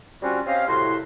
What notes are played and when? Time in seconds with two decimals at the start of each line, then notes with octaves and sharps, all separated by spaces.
0.22 G3 C4 C#4 F4 F#4
0.46 C4 C#4 G4 D#5 F5
0.68 C2 A2 C3 F#4 B4 C6